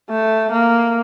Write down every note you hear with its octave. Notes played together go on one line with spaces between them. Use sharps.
A3
A#3